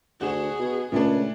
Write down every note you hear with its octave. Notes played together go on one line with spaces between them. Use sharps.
D2 F#4 G#4 E7
B2
C#2 A#2 A3 D4